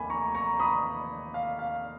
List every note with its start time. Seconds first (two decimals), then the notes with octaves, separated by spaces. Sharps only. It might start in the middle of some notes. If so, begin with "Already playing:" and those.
Already playing: F1 D#2 D#3 G#5 B5
0.10 A#5 C#6
0.35 A#5 C#6
0.60 B5 D#6
1.34 F5
1.59 F5